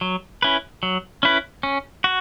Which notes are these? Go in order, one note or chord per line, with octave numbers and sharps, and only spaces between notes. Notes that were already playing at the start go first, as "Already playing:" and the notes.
F#3
C#4 E4 B4
F#3
C#4 E4 B4
C#4
F#4